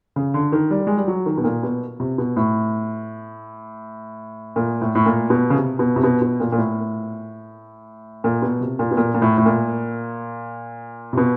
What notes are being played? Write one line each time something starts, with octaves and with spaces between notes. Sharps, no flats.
C#3
D3
D#3
G3
G#3
G3
F#3
D#3
B2
A#2
B2
C3
B2
A2
A#2
A2
A2
A#2
B2
C#3
C3
B2
C3
B2
B2
A#2
A#2
A2
A#2
B2
C3
A#2
B2
A#2
A#2
A2
A2
A#2
C3
B2